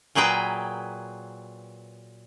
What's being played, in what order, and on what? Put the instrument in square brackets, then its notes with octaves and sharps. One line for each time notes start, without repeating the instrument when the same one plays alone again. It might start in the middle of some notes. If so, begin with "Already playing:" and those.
[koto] A#2 F#3 G#4 B4 G5